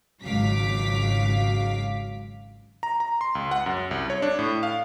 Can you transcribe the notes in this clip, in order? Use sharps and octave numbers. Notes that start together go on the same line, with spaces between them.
G#1 C#2 F#3 F5 D6 B6
A#5
A#5
C6
C#2
F#5
F#2
C2
C#5
D4
A2
F5